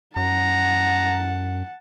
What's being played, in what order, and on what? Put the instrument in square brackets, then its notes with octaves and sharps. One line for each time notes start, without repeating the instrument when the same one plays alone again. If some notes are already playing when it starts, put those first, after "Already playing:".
[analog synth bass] F#2 [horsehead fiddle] F#5 A5 [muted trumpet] A#5